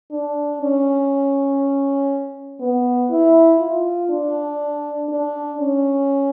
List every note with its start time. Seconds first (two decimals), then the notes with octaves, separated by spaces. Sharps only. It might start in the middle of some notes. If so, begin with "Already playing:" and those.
0.11 D4
0.61 C#4
2.60 B3
3.10 E4
3.60 F4
4.10 D4
5.09 D4
5.59 C#4